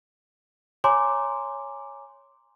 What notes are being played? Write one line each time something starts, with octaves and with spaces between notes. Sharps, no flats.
C#5 G#5 A#5 C6 D6